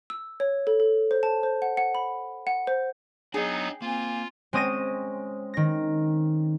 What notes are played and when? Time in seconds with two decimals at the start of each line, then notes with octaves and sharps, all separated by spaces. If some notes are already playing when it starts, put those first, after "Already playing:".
0.10 E6
0.40 C#5
0.67 A4
0.80 A4
1.11 C5
1.23 A5
1.43 C5
1.62 F#5
1.77 F#5
1.95 B5
2.47 F#5
2.67 C5
3.34 F#3 B3 D4 D#4 G#4 D#5 G5
3.82 A#3 C4 F4 G#5
4.53 G#3 C4 C#4 D#6 A#6 D#7
5.54 D#3 A#6